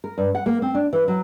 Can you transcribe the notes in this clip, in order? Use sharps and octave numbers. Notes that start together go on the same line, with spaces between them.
A#4
G2
F#5
A#3
C4
D4
E3
F#3